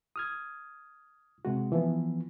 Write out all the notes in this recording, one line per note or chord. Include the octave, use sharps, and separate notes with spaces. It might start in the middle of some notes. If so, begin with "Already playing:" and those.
D#6 F6 G#6
C3 G#3 F#4
E3 F3 B3